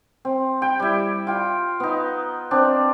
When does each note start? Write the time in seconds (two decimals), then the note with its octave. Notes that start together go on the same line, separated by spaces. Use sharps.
0.25 C4
0.62 G5 B5
0.80 G3 E4
1.27 F4 G5
1.80 B3 D#4
2.51 C4 D4